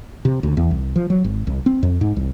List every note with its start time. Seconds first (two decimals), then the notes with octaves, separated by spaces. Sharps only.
0.25 C3
0.43 D2
0.57 E2
0.71 C2
0.96 F3
1.10 F#3
1.24 G#1
1.47 C2
1.66 C4
1.83 F2
2.01 G#2
2.17 C2